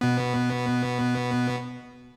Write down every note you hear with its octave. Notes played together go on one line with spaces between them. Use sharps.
B2 B3